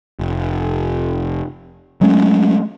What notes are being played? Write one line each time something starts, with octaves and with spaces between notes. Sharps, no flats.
F1
F#3 G#3 A3 C#4